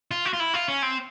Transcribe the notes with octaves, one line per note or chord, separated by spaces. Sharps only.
F4
F#4
F4
E4
F4
C#4
C4